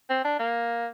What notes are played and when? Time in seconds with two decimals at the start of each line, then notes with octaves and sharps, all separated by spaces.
0.10 C4
0.25 D4
0.39 A#3